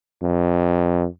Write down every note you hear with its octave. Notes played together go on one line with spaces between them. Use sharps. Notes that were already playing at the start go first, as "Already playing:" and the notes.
F2